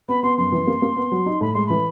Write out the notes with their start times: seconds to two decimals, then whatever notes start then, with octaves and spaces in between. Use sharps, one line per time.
0.08 B3 B5
0.22 B3 C6
0.38 F#2 C6
0.52 E3
0.67 A#3
0.82 A#3
0.97 B3
1.12 F#3
1.26 D#4
1.41 A2 B5
1.53 G#3 C6
1.66 E3 B5